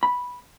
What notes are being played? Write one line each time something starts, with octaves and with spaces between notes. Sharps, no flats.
B5